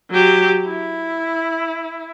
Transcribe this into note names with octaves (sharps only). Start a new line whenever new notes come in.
F#3 G4
E4